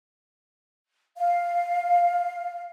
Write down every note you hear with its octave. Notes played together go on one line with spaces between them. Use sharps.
F5